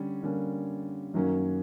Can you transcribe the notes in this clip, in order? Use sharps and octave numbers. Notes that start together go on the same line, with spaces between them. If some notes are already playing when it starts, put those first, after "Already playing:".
Already playing: D3 G3 C#4
D3 G3 A#3 C#4
F#2 D#3 F#3 A#3 C#4